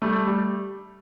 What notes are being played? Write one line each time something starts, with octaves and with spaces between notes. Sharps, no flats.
G3 A3
G3